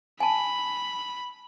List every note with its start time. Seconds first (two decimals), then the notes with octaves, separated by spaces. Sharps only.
0.20 G#5 A5 B5